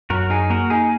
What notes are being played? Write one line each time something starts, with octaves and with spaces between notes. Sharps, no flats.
F#2 F#4 A#4
D#4 G#4
A#3 F#4 A#4
D#4 G#4